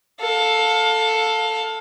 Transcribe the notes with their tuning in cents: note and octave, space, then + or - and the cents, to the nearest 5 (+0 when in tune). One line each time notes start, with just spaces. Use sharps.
A4 +5 F5 +25